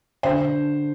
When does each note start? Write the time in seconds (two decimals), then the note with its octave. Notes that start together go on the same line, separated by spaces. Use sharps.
0.23 D3 C5